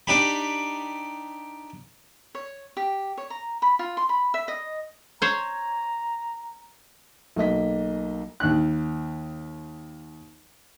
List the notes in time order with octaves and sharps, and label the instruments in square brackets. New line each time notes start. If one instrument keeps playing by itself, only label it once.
[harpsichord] D4 D#4 G4 B5
[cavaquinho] C#5
G4
C#5
A#5
B5
F4
C6
B5
E5
D#5
[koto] C5 C#5 [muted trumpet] A#5
[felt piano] B1 A#3 D#5 B6
[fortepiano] D#2 F#6